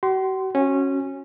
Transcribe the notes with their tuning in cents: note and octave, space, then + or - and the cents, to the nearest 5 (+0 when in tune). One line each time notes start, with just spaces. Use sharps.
F#4 +45 C6 -10
C#4 -15 F#4 +0